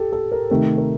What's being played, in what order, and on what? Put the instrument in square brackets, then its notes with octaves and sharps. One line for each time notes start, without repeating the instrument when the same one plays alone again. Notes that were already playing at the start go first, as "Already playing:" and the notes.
Already playing: [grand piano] G4 A4
A4
A#4
[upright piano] C3 D#3 A3 [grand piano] A#4
[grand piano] A#4